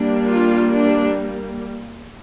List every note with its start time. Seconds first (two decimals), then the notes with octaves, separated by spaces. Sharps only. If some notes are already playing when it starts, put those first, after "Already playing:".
Already playing: G3 A#3 D4
0.27 F4
0.73 D4